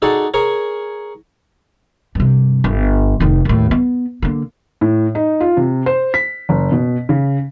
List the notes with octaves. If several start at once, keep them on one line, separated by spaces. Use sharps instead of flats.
D#4 F#4 G#4 A4 D5
G#4 A#4 C#5 G#5
G2 C3
G1
F1 D#3
D#2 A2
B3
D3 A#3
A2
D#4
F4
C3
C5
B6
F#1
B2
C#3